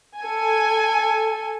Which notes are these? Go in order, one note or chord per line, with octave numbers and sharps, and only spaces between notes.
A4 G#5